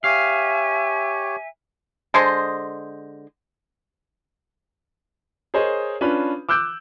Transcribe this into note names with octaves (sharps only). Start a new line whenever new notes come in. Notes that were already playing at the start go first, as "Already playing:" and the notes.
G4 C#5 E5 F5 G#5
D3 G#3 C5 D#5
G#4 A#4 C5 C#5 D#5
C#4 D4 F4 B4 B5
D6 E6 F#6 G6 D7